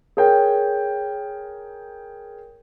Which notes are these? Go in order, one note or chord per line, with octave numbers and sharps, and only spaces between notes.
G#4 A#4 C#5 G5